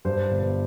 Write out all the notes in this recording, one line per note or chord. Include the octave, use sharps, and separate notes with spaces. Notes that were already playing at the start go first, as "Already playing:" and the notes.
G2 C5
G1